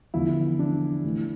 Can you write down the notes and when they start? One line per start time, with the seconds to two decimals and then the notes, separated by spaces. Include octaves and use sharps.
0.14 E2 D3 F3 E4
0.59 D4
1.03 A2 E3